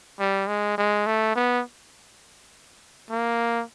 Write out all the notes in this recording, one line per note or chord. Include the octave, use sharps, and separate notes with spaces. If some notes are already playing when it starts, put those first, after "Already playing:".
G3
G#3
G#3
A3
B3
A#3